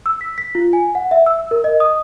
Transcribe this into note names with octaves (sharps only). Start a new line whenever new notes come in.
E6
B6
B6
F4
G#5
F#5
E5
E6
A#4
D#5
D#6